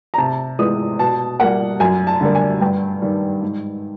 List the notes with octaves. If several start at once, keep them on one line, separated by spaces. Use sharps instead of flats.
A#5
C3 A5
E3 G#3 B3 D#6
B2 A5
G3 A#3 F#5
F#2 G#5
A5
D3 G3 A#3
G#5
G2 G5
D#3 G3 A#3
G#2